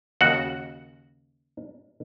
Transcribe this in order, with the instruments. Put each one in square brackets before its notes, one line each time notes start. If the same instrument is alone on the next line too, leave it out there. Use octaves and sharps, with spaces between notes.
[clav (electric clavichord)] D#2 C#3 F#4 F#5